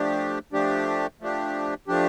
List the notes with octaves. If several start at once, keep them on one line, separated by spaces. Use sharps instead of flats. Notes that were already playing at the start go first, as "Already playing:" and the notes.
Already playing: F3 A3 D4 G4
F3 A3 D4 G4
F3 A3 D4 G4
F3 A3 D4 G4